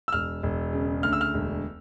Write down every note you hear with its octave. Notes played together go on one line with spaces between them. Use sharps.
E6
E1 F6
E1
C#3
D2 F6
E6
F6
E1